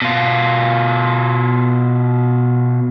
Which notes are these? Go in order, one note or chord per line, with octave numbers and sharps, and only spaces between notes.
B2 F4